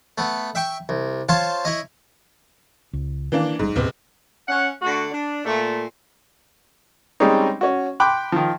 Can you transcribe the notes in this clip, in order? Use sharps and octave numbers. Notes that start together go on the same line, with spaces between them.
A3 B3
E5 G5 C#6
C2
F4 C5 C#5 F5 A5 C6
E4 C#5 D#5
C#2
D#3 E3 A#3 D4
G1 G#2 G3 G#3
F#1 D#2 A2 C3 B3
C#4 F#5
D3 A3 F#4
D4
A#2 A3
G3 G#3 C4 C#4 D#4
C#4 F#4
G5 B5 C6 D6 F#6
D#3 F3